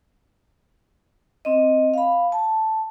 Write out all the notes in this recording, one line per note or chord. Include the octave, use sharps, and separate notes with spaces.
C4 D#5
F5 B5
A5